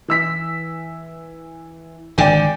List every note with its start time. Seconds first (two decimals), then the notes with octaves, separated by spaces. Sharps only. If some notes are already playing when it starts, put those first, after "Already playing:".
0.08 E3 E6 B6
2.18 G#1 D3 D5 G5 G#5